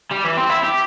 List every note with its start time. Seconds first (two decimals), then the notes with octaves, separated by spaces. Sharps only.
0.11 G3
0.24 E3
0.37 C4
0.50 E4
0.63 G4